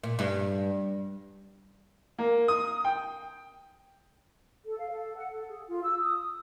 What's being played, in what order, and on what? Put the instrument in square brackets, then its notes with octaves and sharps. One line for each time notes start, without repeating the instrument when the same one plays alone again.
[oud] A#2
G2
[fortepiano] A#3
D#6
G5
[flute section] A4
F5
A4
F#5
A4
G#4
F4
E6
D#6